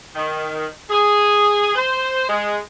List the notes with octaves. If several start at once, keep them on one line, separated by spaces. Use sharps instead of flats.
D#3
G#4
C5
G#3